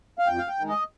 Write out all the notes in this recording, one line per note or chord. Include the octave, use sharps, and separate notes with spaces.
F5
F2 G5
F5
G5
D#3 G#3
D#5